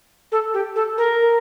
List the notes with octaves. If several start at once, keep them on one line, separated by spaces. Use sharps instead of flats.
A4
G4
A4
A#4